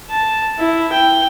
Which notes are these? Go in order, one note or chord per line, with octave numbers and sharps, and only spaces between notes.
A5
E4
G5